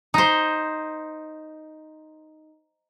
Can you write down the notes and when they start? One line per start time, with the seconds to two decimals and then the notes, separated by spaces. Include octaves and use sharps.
0.14 D#4 C5